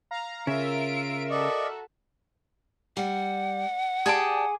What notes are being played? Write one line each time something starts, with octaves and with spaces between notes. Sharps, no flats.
F5 A#5
C#3 F4 A#4 E5 D7
F#4 A4 D5 D#5 C#6
G3 F#5
G4 G#4 D5 A5 D6